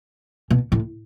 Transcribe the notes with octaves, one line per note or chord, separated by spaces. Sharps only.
B2
A2